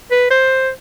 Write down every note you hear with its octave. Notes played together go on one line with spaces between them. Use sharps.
B4
C5